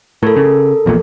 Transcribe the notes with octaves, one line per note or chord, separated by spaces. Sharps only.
A2 A4 A#4
C#3
A#1 E2 A#2